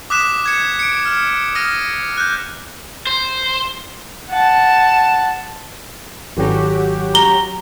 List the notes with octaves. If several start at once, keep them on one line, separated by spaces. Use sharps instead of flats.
D6 D#6 F#6 B6 E7
G#6 C#7
C#7 D7
F6
D#6 F6 A#6 D#7
F#6 G6
C5
F#5 A5
G#1 F#3 C#4 F#4 G4
A#5 G7